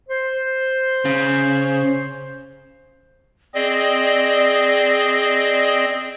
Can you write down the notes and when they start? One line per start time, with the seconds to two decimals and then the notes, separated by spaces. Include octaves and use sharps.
0.09 C5
1.05 C#3
3.54 C4 G#4 D5 D#5